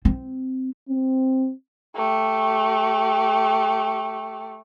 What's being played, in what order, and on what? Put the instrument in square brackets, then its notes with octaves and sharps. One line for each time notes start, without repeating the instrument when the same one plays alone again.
[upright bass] C4
[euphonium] C4
[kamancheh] A3 G4